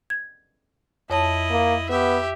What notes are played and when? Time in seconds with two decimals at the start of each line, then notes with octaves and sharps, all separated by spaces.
0.10 G#6
1.10 F2 E4 C#5 D#5 A5
1.51 A#3
1.89 B3 G4 E5